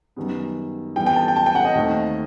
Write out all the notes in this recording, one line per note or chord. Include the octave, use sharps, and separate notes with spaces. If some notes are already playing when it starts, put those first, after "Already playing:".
F#2 D#3 G3 B3
G2 E3 G3 B3 G5
G5
A5
G5
A5
G5
F#5
D#5
D#2 D#3 A3 C4